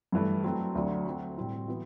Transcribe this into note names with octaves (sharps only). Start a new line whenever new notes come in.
G2 E3 A3
F#3 A3 C4
D2 D3 F#3
F#3 C4 F#4
A2 G3 C4 E4
E3 B3 F#4